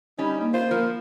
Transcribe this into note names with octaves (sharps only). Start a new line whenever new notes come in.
G3 C#4 D#4
A#3 D#4
F4 C5
F3 A#4